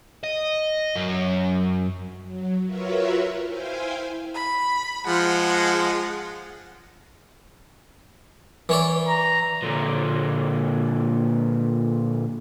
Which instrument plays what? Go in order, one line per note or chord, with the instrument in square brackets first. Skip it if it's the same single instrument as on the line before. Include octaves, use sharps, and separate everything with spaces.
[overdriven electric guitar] D#5
F#2
[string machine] F#3
F4 F#4 A#4 B4 C#5 E5
E4 C5 F5 G5 G#5
[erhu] B5
[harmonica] F3 G#3 [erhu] F#5
[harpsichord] E3 C#5 D5
[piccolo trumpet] A#5
[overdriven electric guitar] A#2 D3